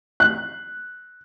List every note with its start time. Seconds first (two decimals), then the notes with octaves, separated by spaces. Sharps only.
0.20 F#6